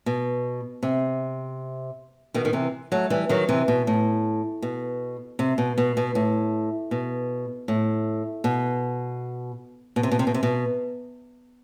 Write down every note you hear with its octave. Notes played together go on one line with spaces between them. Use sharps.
B2
C3
B2 D#3
D#3
C3 E3
F#3 A3
E3 G3
D#3 F#3
C3 E3
B2
A2
B2
C3
B2
B2
B2
A2
B2
A2
B2
B2
C3
B2
C3
B2
C3
B2